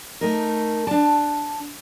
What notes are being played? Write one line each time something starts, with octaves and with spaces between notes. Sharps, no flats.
A3 D#4 A#4
D4 A5